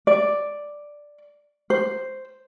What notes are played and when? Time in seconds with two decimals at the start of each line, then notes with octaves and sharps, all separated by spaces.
0.07 D5
1.70 C5